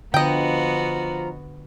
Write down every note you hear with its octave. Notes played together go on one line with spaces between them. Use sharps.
D3 F3 B3 F4 F#4 D#5 G5 A#5